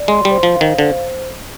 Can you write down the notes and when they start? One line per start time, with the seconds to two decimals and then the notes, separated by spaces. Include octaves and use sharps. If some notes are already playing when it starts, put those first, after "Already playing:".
Already playing: D5
0.08 G#3 C6
0.25 G3
0.31 C5
0.43 F3
0.55 F5
0.61 D#3
0.79 D3 C5